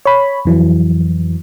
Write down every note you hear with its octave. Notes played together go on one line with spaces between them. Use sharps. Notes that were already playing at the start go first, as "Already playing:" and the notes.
C#5 B5
F2 E3 F#3